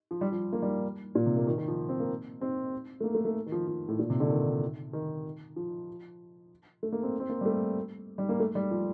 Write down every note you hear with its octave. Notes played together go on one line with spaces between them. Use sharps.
F3
G3
F3
A#3
G3
A#2
C3
A#3
D#3
D#3
F3
C4
A#3
C4
A3
A#3
A3
A3
D#3
F3
F3
A2
A#2
C3
D3
D#3
D#3
F3
A3
A#3
C4
C4
A#3
G3
A3
G3
A#3
A3
G3
F3